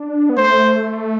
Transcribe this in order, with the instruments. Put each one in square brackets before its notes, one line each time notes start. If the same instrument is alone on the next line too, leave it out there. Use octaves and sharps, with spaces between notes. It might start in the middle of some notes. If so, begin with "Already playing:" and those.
Already playing: [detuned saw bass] D4
B3
[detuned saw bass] A3 [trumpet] C5